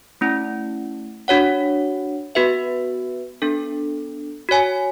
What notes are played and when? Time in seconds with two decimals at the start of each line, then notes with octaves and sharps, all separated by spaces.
0.21 A3 C#4 E4
1.28 D4 F#4 C#5 F#5
2.35 B3 F#4 B4 E5
3.42 B3 D4 A4
4.49 F#4 C#5 G#5